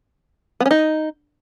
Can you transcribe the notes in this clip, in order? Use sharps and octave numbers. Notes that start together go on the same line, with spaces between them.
B3
C#4
D#4